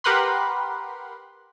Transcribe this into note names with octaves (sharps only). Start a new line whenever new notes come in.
G4 A#4 B4 F#5 B5 C6